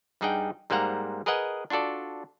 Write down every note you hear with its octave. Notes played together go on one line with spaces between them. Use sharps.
G2 G3 D#4 G#4 F#5 G5
G#2 G3 A#3 C5 F#5 A#5
G#4 A#4 B4 D#5 F#5 G#5
D4 F4 F#4 A4 D5